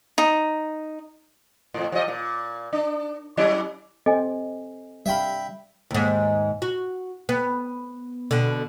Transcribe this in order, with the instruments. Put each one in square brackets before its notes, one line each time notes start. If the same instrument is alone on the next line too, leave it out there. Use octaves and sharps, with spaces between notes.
[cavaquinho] D#4
[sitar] F2 A2
F3 G3 D#5
A#2
D4
F#3 C#4 E4
[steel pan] C4 [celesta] A4 G#5 [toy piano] D#5
[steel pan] G3 F5 [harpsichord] E5 G5 B5
[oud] D#2 G#2
F#4
B3
B2 D3